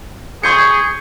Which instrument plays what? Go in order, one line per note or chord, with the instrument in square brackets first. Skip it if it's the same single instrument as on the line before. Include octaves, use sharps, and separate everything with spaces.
[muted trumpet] G#4 [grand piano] C#6 G6 C#7